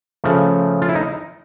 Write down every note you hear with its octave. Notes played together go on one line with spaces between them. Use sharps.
C#3 F3 A3
F4
E4
D#4